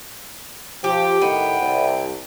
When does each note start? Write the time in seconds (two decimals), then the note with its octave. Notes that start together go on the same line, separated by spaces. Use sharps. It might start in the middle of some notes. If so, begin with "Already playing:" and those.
0.84 F3 G4 G5
1.21 A2 D#3 B3
1.60 C2